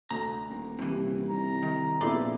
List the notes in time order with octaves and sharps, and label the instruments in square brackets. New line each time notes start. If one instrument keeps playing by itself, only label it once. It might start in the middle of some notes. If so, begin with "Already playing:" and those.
[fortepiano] D2 [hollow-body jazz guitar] A#5
[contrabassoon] D#1
[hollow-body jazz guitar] G2 E3 [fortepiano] C3
[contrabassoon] C2 [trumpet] A#5
[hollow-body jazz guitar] D#3
[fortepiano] A#1 B3 [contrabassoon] F2 [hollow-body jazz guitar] C#3 D5 C6 [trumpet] E4